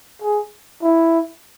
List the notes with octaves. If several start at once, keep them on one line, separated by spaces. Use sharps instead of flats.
G#4
E4